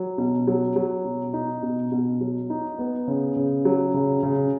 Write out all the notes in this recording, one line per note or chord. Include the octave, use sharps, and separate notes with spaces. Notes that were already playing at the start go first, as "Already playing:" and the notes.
Already playing: F#3
B2
F#3
F#3
B2
D#4
B2
B2
F#3
D#4
B3
C#3
C#3
F#3
C#3
C#3